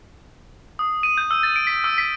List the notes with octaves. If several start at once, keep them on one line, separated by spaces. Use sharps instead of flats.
D#6
D#7
G6
E6
A6
D7
B6
E6
B6